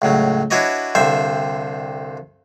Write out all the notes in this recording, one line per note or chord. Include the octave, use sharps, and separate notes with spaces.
C#2 A2 F#3
D4 E4 F#4 B4 C#5 D#5
C2 G2 D3 C5 E5